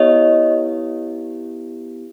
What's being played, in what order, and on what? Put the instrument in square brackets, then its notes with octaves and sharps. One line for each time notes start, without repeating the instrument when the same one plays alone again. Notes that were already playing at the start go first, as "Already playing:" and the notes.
Already playing: [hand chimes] B3 E4 G4 C#5 D#5